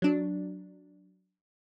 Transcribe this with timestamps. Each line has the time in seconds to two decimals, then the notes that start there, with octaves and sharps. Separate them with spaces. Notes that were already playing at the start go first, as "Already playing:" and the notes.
0.02 F#3 D4